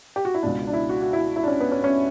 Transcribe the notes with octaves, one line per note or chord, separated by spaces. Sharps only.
G4
F#4
E4
C#2 B2 D4
D4
E4
F#4
F#4
E4
E4
D4
C#4
B3
C#4
C#4